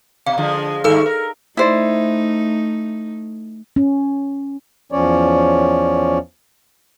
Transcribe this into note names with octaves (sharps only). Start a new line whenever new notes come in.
B2 F5
D3 F3 G#3
G2 D#3 A3 A4 E6
A#4
A3 D#4 E4 C5 D5
C#4
E2 F3 C#4 C#5 D5